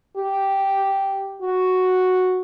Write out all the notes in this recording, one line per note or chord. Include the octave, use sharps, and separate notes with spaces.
G4
F#4